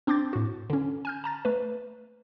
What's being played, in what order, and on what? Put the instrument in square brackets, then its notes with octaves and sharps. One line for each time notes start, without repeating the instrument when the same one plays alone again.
[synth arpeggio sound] C4 D4 C6 D6 G6 A6
A2 F#4
D3 C#4
G#5 F6 G6
A5 A#5 A6
A3 B4